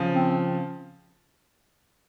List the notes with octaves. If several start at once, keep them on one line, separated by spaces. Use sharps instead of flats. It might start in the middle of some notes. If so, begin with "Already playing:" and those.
Already playing: C#3 F3
C4